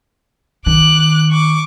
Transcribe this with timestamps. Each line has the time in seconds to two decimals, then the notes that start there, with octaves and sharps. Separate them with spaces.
0.66 D#3 D6 F#6
1.30 C#6 D6